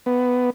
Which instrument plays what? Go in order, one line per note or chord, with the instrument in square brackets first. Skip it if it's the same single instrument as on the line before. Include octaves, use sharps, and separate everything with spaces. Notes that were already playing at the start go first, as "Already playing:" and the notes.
[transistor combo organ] B3